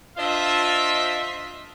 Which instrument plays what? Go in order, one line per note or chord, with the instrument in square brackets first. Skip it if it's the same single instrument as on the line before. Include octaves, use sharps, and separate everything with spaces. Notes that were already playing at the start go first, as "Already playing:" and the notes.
[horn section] D4 F4 C5 D#5 E5